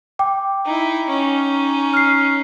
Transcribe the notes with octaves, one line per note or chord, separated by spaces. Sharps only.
G5 D6
D#4 E4
C#4 D#4
F6 C7